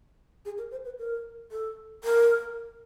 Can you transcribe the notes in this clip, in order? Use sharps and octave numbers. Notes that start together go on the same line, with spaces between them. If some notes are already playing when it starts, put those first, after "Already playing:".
G#4
A#4
C5
B4
A#4
A4
A#4